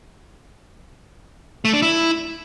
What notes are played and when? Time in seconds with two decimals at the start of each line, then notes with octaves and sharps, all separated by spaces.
1.65 A3
1.73 D4
1.82 E4